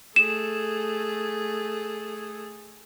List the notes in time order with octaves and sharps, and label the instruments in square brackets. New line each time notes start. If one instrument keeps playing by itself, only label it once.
[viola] A3 G#4 [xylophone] E7